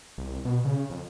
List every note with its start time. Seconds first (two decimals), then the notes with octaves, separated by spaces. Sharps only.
0.18 C2
0.45 B2
0.65 C#3
0.90 F2